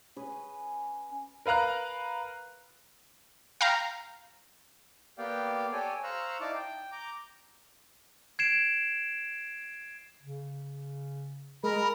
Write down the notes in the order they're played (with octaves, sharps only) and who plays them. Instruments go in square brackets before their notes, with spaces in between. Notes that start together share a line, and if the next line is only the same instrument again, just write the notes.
[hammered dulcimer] C#4 G#4 B4
[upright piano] A#4 B4 F5 A#5 F#6
[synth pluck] F5 G5 A#5
[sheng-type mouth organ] A#3 B3 G4 D5 F5 G5
G4 A4 C#5 D5 G5 G#5
C5 F5 A#5 C#6 E6 F#6
D#4 E4 D5 F5 A5 D6
G5
A#5 D6 G6
[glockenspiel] G#6 C7 D7 E7
[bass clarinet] C#3
[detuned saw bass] G#3 [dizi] A#4 [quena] B5